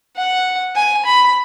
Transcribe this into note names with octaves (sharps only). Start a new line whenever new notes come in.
F#5
G#5
B5